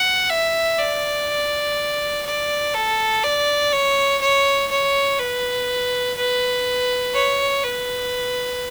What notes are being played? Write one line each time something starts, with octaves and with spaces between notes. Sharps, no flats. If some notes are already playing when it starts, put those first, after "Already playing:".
Already playing: F#5
E5
D5
D5
A4
D5
C#5
C#5
C#5
B4
B4
C#5
B4